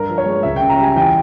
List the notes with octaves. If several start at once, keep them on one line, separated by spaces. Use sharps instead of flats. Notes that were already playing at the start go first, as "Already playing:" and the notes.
Already playing: G2 A#4
F3
C#5
G#3
C#2 E5
C#3 G5
A#5
G3 G#5
E2 G5